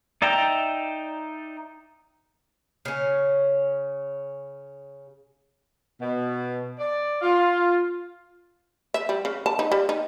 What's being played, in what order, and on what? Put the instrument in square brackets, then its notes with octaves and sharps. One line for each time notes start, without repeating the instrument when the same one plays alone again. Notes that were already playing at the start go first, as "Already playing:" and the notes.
[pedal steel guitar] D#4 D5 E5 G5 A#5
[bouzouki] C#3 C#4
[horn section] B2
D5
F4
[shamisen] E5
G3
C#3
A5
D#4
G3
D#4